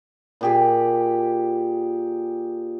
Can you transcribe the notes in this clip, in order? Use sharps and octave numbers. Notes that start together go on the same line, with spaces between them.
A#2 G4 G#4